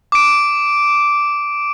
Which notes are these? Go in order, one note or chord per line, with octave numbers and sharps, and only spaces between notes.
D6 D7